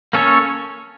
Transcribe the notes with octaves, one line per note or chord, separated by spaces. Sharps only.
A#3 C#4 A4 C#5